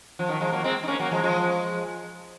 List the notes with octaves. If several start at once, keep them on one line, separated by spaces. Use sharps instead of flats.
F3
D#3 F#3
F3 G#3
F#3 A#3
G#3 C4
D#4
A#3 C#4
F#3 A#3
F3 G#3
F3 G#3